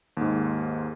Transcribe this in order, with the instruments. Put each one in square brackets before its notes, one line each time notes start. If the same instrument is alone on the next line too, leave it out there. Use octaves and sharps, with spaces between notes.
[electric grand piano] D#2 G#2